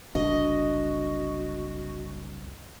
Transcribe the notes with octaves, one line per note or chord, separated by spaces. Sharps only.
F#1 C2 D4 F#4 D#5